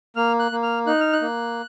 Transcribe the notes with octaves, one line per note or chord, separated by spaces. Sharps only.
A#3 F6
F#6
A#3
F6
D#4 F#6
F6
F#6
A#3